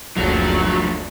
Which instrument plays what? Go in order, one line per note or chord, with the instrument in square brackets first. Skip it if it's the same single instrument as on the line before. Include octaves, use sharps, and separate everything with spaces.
[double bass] F#1 D2 [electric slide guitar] F3 A3 D4 [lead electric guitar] F#3